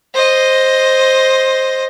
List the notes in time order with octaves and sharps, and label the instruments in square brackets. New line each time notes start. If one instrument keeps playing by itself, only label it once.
[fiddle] C5 D#5